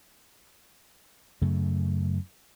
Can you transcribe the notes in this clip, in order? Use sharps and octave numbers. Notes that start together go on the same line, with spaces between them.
F#2 C#3 A3